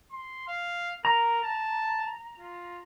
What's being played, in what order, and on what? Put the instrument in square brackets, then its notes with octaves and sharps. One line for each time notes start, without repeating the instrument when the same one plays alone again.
[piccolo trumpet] C6
F5
[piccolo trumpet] A#4 [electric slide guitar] A#5
[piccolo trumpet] A5
F4